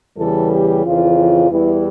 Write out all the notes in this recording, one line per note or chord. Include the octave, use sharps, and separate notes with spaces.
E2 C#3 E3 G3 A4
G4
F2 C#3 E3 F4
E2 E3 G3 E4